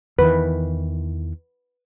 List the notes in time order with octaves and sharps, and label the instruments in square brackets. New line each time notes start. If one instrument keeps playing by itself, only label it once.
[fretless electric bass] E2 D#3 E3 [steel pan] B4